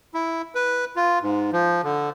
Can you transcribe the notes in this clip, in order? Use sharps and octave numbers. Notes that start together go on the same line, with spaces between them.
E4
B4
F4
G#2
F3
D3